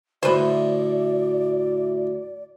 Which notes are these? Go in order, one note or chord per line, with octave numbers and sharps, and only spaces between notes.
D2 A2 B4 C5 D5